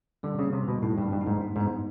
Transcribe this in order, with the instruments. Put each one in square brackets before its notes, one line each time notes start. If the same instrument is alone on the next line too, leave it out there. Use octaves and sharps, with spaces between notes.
[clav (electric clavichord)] D3 [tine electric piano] G3
[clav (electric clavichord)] C#3 [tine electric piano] A#3
[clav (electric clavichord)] C3
[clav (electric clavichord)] B2 [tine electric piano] D3
[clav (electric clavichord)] A2 [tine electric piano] D#4
[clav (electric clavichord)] G2 [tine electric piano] G3
[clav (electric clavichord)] G2
[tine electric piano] D#4
[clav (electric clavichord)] G#2
[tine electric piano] D4
[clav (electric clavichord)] G#2 [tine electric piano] B3